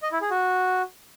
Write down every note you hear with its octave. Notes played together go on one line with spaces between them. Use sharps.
D#5
E4
G#4
F#4